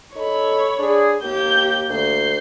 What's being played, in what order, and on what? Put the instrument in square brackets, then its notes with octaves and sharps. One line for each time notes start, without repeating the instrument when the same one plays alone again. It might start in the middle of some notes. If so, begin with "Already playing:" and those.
[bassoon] D#4 [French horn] A4 [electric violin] C#5 B5
[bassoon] D4 [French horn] G#4
[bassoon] D#2 [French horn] A#3 [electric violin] G4 G6
[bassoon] D2 [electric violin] G6 C7